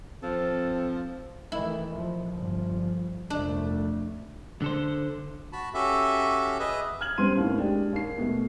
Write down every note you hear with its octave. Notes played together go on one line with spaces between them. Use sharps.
F3 C4 A4
D#3 E3 A3 E4
D#2 F3
G1 F3
C2 F2 A3 D4
D3 A4 C5
F#4 A5 B5
C#4 F#4 G4 A4 E5
G#4 B4 D#5 E5
F6 G#6 F#7
F#2 G3 B3 C4 C6 D#7
D#2 A2
G#3 D4 G4
D#2 C7
B2 A3